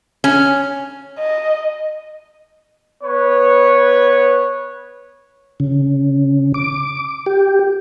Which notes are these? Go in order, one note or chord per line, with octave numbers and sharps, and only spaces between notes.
C#4
D#5
B3 B4 C#5
C#3
D6
G4